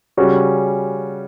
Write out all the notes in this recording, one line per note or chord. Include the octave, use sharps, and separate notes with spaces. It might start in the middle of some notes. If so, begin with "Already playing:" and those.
C#3 G3 C#4 F#4